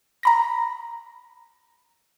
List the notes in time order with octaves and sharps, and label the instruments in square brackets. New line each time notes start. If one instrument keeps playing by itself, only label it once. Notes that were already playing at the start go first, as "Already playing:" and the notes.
[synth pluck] A#5 B5 A#6